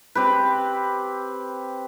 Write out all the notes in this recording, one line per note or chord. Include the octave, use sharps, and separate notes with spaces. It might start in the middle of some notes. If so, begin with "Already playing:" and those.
C4 G4 B4